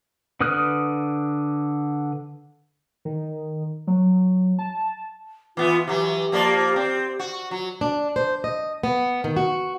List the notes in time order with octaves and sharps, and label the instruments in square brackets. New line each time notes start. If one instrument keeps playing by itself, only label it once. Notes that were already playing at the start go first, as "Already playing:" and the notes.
[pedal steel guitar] D3 B4 D#6 F6 F#6
[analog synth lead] D#3
F#3
A5
[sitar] E3 B3 [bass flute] F4
[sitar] E3 F#3 [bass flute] G4
[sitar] F3 A#3 D5
C4
F#4
[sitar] F#3 [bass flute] F#4
[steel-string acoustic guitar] D4
C5
D#5
B3
D#3
F#4